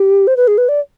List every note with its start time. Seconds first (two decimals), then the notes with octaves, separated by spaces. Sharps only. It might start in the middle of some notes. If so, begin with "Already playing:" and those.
Already playing: G4
0.27 C5
0.37 B4
0.47 G#4
0.58 B4
0.69 D5